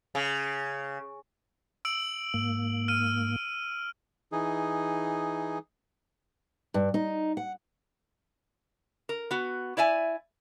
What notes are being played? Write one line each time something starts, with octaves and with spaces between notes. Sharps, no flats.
C#3
E6 D7 F#7
G#2 A#3
F6 D#7
E3 D#4 G#4
G2
D#4
F#5
A#4
B3 F#4
E4 D5 E5 G#5